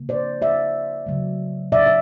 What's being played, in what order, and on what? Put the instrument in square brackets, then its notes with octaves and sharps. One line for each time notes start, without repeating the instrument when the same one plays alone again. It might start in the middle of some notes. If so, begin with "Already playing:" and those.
Already playing: [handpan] C#3 F3 A#3
C5 D5
D5 E5
C#3 F#3 A3
D5 E5
E5